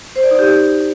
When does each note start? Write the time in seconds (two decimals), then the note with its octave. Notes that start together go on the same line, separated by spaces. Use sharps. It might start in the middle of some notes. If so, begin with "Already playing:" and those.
0.16 C5
0.23 D5
0.31 D#4
0.39 G4